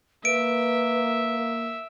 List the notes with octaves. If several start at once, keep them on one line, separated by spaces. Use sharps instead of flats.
A#3 B4 E5 D7